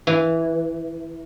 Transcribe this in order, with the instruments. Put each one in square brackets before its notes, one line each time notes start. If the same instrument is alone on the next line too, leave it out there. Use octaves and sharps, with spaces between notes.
[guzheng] E3